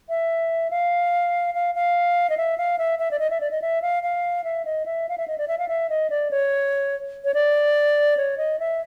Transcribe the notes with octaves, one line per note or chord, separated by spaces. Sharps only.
E5
F5
F5
F5
D#5
E5
F5
E5
E5
D5
D#5
E5
D5
D#5
E5
F5
F5
E5
D#5
E5
F5
E5
D#5
D5
E5
F5
E5
D#5
D5
C#5
C#5
D5
C#5
D#5
E5